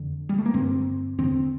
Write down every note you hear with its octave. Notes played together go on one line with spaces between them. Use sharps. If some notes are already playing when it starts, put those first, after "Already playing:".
Already playing: F2 D3
G3
A3
A#3
G2 D3 C4
E2 D3 C4